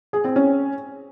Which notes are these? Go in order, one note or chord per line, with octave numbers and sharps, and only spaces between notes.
G#4
C4
C#4